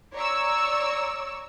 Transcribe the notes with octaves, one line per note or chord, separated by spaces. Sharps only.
C#5 D5 A#5 C#6 E6